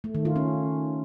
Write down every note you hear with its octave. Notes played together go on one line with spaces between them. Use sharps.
A3
D#3
F4
C#4